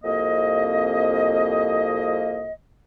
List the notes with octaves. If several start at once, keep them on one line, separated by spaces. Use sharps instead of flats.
C2 F2 A#3 D#5